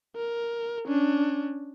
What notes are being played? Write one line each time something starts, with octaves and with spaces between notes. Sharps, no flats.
A#4
C#4 D4